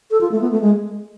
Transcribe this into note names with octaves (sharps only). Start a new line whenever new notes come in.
A4
F4
A3
B3
A3
G#3